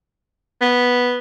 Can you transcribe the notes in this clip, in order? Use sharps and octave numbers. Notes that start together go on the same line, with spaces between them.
B3